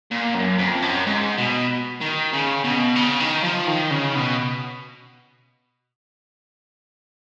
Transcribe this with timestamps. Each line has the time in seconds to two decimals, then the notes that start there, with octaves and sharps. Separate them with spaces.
0.11 A#2
0.35 F#2
0.58 F2
0.82 F#2
1.06 G#2
1.38 B2
2.01 D#3
2.33 C#3
2.64 B2
2.96 C#3
3.20 D#3
3.44 F3
3.67 D#3
3.91 C#3
4.15 B2